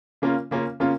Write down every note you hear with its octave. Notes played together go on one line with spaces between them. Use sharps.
C#3 A#3 C#4 F4
C#3 A#3 C#4 F4
C#3 A#3 C#4 F4